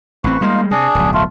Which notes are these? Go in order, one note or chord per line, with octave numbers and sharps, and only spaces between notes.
A1 C4 B4 C#6
G3 G#3 A#3 D#4 F4 F5
C3 D4 G#4
D1 B1
A3 F4